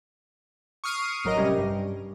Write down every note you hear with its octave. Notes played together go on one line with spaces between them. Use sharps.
C#6 D#6 F6 C7 D7 D#7
A1 F#3 A#4 D#5 A#6
C3 G3 C#4 G4
G2